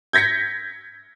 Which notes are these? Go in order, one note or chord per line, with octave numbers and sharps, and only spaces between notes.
G6 G#6 A#6 B6 C#7